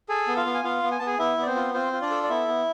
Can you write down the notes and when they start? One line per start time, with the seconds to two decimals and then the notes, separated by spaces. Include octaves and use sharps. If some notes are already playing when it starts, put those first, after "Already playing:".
0.09 G#4 A4 G#5
0.28 B3
0.37 F4 F5
0.46 B3
0.54 G#5
0.64 B3 F4 F5
0.83 B3
0.92 G#5
0.99 B3 A5
1.06 G#4 G#5
1.19 B3 E4 E5
1.37 B3 D5
1.47 C4 C5
1.56 F4
1.74 C4 F4 C5
1.93 F4
2.02 D4 D5
2.11 A4
2.23 D5
2.29 B3 E4 E5
2.48 B3